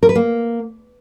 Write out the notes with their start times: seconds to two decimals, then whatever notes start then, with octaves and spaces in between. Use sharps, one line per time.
0.03 A#4
0.09 B4
0.15 A#3